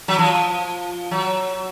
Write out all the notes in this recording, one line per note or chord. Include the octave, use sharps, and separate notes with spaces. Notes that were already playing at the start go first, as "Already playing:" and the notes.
F#3
F3
F#3